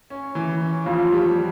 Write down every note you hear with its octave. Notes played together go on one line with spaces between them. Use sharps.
C#4
E3
C#4
F2 F4
G3